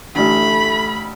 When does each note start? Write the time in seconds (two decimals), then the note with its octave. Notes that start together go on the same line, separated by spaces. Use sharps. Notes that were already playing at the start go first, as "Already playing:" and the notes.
0.15 A1 D3 A3 B5